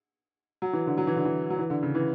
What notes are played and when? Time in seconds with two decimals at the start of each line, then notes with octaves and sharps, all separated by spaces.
0.62 F#3
0.73 E3
0.87 D3
0.98 F#3
1.07 E3
1.16 D3
1.25 E3
1.50 F#3
1.59 E3
1.70 D3
1.83 C#3
1.95 E3